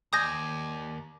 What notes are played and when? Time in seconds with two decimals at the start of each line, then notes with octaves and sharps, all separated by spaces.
0.13 D#2 D5 G#5 D#6 G6 A#6